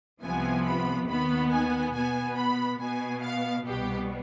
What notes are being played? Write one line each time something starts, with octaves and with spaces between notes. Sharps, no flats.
C2 C3 F3 B3 G#5
B5
D#2 D#3 B3 B5
G#5
B2 B3 G#5
B5
B2 B3 G#5
F5
C2 B2 G3 B3 G4